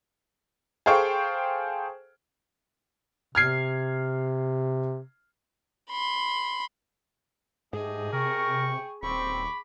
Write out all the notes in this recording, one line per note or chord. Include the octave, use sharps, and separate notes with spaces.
G#4 A4 C5 F5 G5 C#6
C3 F6 G#6 C7
B5 C6
G#2 A3 G4 G#4 D#5
C3 A#4 G5 C#6
D#1 C4 B5 C#6 D6